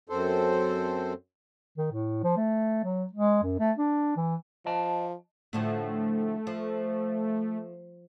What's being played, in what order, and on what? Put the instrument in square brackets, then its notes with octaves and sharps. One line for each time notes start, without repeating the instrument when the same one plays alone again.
[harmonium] F#2 C4 A4 C5
[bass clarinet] D#3
A2
F3
A3
F#3
G#3
F#2
A3
D4
E3
[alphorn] F3 [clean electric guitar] D#5 A5
[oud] A2 D3 F3 [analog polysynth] A3
[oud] F3